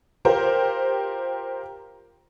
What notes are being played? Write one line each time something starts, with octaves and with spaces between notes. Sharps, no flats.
F4 G4 A#4 C5